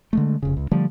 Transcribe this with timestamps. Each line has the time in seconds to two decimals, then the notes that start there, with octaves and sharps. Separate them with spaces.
0.13 D3 G#3 A3
0.42 F1 C#3
0.57 C#2
0.72 D3 F3 G3 A3